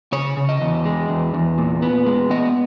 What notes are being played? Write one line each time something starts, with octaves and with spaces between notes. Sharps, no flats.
C#3 C#5
C#3
D#5
E2
G#3
E2
E2
A#2
B3
G#3
B3 D#5